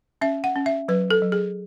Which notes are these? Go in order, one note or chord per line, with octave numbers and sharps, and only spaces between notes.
C#4 E5
F#5
C#4
E5
F#3 B4
A4
F#3
G#4